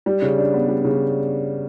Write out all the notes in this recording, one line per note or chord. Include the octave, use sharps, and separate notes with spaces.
G3
C#3
D4
B3
G3
C#3